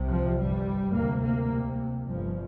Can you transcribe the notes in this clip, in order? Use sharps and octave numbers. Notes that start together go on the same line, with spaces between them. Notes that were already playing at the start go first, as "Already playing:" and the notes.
Already playing: C2 C3
F3
G1 G2 G3
D2 C3 A#3
A#3
C2 C3
G1 G2 F3